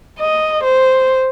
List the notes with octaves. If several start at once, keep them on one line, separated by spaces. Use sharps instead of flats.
D#5
C5